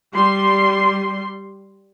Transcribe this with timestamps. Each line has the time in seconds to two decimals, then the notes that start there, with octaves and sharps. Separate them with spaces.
0.14 G3 C6